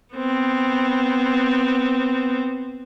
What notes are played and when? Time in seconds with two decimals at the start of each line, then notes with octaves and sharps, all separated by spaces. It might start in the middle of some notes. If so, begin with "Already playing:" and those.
0.15 B3 C4